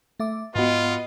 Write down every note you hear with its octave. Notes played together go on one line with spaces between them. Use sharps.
A3 E5 D6
G#2 B3 F4 F#4 D#5